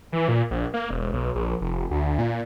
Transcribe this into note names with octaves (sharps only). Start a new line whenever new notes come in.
E3
A#2
A#1
A#3
E1
B1
A#1
F1
D2
A#2